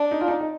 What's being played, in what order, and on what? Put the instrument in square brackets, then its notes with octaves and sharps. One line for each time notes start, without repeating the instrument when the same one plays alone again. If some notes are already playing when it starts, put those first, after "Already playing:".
Already playing: [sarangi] D4
[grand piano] D#4
F4
D#4
D#4